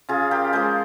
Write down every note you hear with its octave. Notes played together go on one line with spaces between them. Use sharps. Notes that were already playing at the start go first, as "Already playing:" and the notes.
C#3 F4 G#4
G4 A#4
F3 G#3 G#4 C5